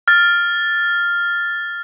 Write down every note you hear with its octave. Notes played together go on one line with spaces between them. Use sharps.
F6 A6